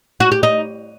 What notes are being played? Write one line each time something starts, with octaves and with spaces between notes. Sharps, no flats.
F#4
G4
D#4